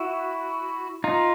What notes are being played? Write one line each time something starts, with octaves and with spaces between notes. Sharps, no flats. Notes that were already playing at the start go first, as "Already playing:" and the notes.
Already playing: E4 F#4
D#4 F4